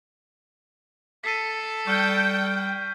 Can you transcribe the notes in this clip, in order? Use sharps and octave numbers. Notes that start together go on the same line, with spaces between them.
A4 B6 C7 D#7
G3 G5 C#6 F6 G6